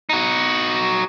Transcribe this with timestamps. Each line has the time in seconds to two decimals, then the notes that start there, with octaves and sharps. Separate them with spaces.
0.10 D#4 F#4